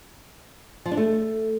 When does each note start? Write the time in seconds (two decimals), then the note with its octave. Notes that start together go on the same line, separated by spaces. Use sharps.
0.86 F3
0.91 D4
0.97 A3